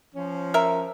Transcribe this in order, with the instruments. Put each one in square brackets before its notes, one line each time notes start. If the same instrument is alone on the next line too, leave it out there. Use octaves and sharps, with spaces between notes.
[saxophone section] F3 C#4
[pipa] A#4 E5